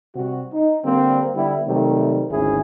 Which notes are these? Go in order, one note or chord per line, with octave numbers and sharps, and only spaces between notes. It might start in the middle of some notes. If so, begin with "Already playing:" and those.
C3 G3 F#4
D#4
D3 G3 A#3 C4
D3 G3 B3 E4
C3 D#3 F#3 G3 A3
G#1 D2 C#4 E4 G#4